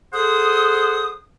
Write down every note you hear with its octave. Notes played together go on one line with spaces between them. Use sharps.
G#4 A4 C5 F#5 D#6